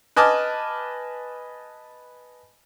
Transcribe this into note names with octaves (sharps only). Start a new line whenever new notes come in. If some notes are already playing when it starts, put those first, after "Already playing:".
B4 D#5 G#5 A5 D6 F6